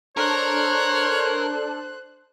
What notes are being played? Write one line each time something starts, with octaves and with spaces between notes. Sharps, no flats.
D4 A4 A#4 C5 C#5 F#6